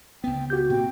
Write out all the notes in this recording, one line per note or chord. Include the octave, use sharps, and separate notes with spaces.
C#2 B3 G5
F#4 G4 G6
A#2 C4 G5